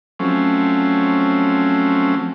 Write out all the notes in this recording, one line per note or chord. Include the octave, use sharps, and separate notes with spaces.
F3 F#3 A3 C4 C#4